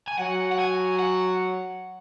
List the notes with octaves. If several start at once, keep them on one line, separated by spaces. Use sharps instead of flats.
G#5
F#3 F#5
F#5
G#5
F#5